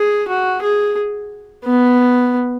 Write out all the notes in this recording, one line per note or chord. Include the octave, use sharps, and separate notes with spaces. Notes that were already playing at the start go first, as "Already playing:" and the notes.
Already playing: G#4
F#4
G#4
B3